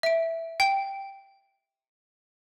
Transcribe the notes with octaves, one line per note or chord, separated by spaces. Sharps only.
E5 D7
G5